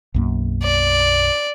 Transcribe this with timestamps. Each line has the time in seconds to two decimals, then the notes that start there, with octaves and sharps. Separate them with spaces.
0.14 B1 F#2 A#3
0.63 D5